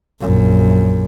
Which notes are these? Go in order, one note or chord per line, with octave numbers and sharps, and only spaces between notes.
A#1 F#2